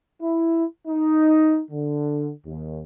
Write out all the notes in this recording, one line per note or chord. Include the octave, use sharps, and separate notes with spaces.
E4
D#4
D3
D#2